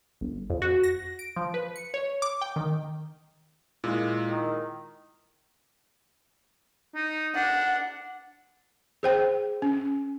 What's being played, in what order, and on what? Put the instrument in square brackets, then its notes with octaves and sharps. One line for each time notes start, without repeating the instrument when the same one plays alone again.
[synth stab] G1
F2
F#4
A#6
D7
F3
B4
C#7
C#5
D6
G5
D#3
[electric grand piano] A#2 G#3 [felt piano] E4 F4
[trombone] D#3
[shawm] D#4
[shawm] D4 [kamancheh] F#5
[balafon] G#4 C5 G5
C#4